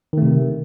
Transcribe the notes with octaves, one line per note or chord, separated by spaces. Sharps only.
C3 D#3 A3